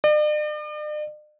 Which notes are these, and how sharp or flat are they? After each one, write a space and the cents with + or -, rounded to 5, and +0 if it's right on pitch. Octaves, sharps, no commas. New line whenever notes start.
D5 +45